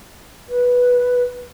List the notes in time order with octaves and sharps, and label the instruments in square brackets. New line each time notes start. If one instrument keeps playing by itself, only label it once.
[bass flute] B4